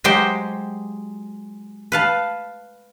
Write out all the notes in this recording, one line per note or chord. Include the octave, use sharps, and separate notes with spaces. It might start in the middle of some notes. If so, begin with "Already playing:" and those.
F#3 G#3 G4 C5 G5
B4 F5 A5